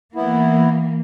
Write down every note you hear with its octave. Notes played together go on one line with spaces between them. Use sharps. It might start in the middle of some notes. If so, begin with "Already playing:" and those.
E3 A#3 B3 E4